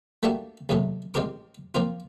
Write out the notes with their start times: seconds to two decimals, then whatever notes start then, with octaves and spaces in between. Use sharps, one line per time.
0.23 G3 A3 A#3 D4 F#4 G4
0.69 D#2 G#2 C3 F#3 A3
1.14 A1 G#3 C4 G4 A#4 D6
1.75 F3 A#3 C4 F4